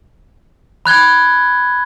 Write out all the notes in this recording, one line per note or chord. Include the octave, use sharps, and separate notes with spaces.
B5 F#6 G#6 G7